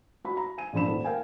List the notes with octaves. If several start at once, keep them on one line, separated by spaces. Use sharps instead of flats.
F#4 B5
A#5
G#5 D#7
A#1 C#3 F3 D4 B5 E7
D#1
A#4 F5 G5 G#5